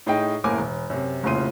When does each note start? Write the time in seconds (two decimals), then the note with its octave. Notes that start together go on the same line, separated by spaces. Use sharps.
0.06 A2 D#4 G#4 D#5 G5
0.44 F#1 D#2 A2 A#4 G#5 D6
0.58 E1
0.90 F#2 C3
1.23 F1 C2 A#2 C#3 C6 D#7